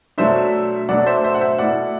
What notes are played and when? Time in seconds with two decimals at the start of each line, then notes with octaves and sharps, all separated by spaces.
0.18 B2 F#3 A3 D4 C5 E5
0.88 B2 F#3 A3 D4 D5 F#5
1.06 C5 E5
1.24 C5 E5
1.34 F#5
1.41 C5 E5
1.58 B2 A3 E4 D5 F#5